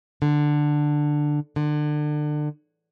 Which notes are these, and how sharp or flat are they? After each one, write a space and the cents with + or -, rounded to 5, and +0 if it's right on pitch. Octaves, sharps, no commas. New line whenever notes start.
D3 +10
D3 +30